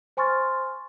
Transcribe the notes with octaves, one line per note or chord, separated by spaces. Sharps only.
C5 G#5 C6 C#6 F6 A6